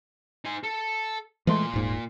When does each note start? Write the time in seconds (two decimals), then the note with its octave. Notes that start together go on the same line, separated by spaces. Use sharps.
0.45 D#4 G#5
0.63 A4
1.47 A#2 E3 G#3 A3 C6
1.73 D#1 G#2